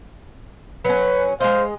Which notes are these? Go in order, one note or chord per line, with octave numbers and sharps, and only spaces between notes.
F#3 C#4 B4
G#3 C5 D#5 F5